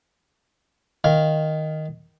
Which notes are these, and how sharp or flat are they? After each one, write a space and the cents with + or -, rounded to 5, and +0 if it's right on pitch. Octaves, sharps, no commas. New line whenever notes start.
D#3 +0 F5 +0